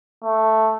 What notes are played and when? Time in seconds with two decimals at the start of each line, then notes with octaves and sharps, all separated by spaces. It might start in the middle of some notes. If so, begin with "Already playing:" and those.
0.24 A3